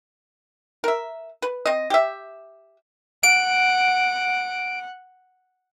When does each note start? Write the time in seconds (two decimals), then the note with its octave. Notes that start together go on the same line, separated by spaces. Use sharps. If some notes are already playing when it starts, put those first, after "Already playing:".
0.84 A#4 E5
1.42 B4
1.66 C4 D#5
1.90 G4 E5
3.23 F#5 D7